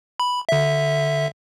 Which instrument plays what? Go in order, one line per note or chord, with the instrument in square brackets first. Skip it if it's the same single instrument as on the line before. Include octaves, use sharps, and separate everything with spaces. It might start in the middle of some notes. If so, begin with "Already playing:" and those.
[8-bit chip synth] B5
D3 E5